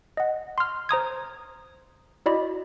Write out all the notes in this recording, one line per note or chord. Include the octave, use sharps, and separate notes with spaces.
D#5 F#5
C6 F6
C5 A#5 D#6 G#6
E4 F#4 D5 D#5 B5